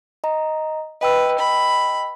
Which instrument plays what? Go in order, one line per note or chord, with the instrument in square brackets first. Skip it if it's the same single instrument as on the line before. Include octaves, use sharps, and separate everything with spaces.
[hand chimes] D#5 A#5
[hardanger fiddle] B4 [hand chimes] D#5 G5 E6
[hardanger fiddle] B5